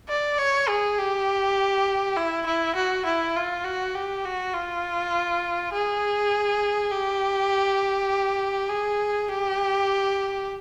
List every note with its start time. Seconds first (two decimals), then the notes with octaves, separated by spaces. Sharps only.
0.09 D5
0.38 C#5
0.68 G#4
0.98 G4
2.16 E4
2.46 E4
2.75 F#4
3.05 E4
3.36 F4
3.64 F#4
3.95 G4
4.25 F#4
4.54 F4
5.72 G#4
6.92 G4
8.69 G#4
9.28 G4